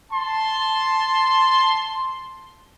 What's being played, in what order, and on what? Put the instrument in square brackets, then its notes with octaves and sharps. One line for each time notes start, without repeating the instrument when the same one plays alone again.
[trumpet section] A5 C6